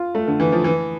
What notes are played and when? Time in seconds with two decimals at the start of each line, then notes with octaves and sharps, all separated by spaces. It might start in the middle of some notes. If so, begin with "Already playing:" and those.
Already playing: F4
0.15 A3
0.27 D3
0.40 E3
0.52 F3
0.64 E3